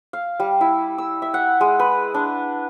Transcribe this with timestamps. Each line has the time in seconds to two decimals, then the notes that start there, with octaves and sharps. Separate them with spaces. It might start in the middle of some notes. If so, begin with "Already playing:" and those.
0.13 F5
0.40 G3
0.61 E4
0.98 E6
1.22 E5
1.34 F#5
1.61 G#3
1.79 B4
2.14 D4